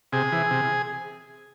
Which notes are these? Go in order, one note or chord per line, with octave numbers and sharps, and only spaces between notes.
C3 G#4
E3
C3